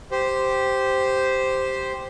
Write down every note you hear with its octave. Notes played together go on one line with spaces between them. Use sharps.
G4 C5